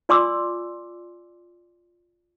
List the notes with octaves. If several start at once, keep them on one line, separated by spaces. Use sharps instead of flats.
F4 D5 G#5 C6 D6 E6